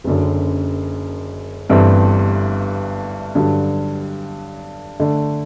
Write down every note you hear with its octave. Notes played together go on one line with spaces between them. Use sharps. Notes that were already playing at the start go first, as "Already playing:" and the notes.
F#1 F#2 D3
G1 G2 E3 A3 C4
G2 D3 F#3
D3 A3 D4